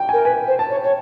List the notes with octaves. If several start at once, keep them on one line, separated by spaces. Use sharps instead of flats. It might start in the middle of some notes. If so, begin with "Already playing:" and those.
Already playing: G5
G#5
A#4
B4 G#5
C5
A5
C#5
C#5